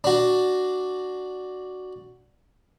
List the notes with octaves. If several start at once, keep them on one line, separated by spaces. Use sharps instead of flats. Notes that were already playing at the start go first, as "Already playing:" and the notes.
D4 F#4